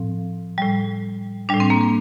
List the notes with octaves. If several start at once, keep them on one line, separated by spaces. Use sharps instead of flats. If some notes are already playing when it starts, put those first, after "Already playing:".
Already playing: A2 F3 C4
A2 G3
A2 G3 D4
C4
A#3
C4